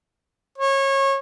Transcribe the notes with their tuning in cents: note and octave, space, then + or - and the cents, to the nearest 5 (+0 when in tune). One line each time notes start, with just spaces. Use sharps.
C#5 -25